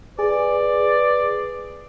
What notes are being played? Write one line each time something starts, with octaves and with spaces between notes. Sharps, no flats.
G#4 B4 D5